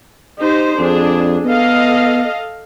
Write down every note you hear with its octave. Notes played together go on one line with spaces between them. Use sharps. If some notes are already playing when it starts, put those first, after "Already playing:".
D#4 G4 C5
F2 D4 G#4
B3 A4 D#5 F5